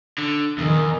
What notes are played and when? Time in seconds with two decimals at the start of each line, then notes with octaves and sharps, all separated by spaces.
0.18 D3
0.58 E2 D#3